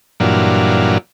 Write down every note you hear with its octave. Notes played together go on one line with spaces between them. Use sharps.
G2 A#2 E3 F#3 D4 F4